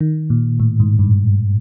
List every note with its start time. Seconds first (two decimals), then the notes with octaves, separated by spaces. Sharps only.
0.01 D#3
0.30 A#2
0.60 A2
0.80 G#2
0.99 G2